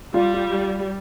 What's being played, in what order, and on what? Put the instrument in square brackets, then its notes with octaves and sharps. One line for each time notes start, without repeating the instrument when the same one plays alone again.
[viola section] G3 [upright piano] F4
[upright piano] F4